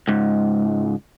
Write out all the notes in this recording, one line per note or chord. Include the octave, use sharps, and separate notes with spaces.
C#2 G#2